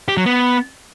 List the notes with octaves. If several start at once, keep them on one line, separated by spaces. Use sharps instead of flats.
G4
F#3
B3